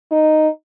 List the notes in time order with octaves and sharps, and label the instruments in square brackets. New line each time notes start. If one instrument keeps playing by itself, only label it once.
[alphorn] D#4